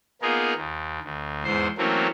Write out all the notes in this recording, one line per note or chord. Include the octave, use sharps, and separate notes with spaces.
A#3 B3 D#4 F4 G#4 A#4
D#2
D2
E2 G#2 C5 C6
E3 F#3 A3 A#3 C4 C#4